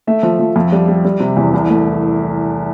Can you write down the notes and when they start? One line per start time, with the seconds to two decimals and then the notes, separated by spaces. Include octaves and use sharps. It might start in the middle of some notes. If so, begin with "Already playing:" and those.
0.07 A3 E5
0.23 F3
0.39 F3
0.56 F2
0.72 G3
0.88 G3
1.05 G3
1.20 C3
1.37 E2
1.53 C2
1.69 A3